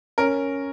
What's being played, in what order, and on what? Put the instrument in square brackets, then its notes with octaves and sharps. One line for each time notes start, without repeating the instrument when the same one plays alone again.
[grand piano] C#4 [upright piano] A#4